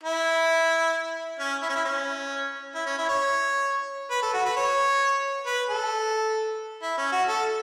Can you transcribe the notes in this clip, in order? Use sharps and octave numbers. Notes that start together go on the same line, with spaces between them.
E4
C#4
E4
C#4
E4
C#4
E4
C#4
E4
C#5
B4
A4
F#4
B4
C#5
B4
A4
E4
C#4
F#4
A4